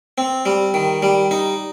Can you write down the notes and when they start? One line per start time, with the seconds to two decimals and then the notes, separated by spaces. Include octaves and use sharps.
0.18 C4
0.46 G3
0.74 D#3
1.03 G3
1.31 D#4